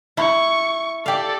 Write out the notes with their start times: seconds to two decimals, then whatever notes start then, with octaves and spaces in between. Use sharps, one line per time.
0.17 E4 C#6
1.06 G4 A4 D5 F5